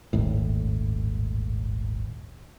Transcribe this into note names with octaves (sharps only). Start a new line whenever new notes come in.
D#1 G#1 A2